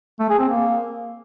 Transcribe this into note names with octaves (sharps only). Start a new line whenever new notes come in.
A3
G#4
C4
A#3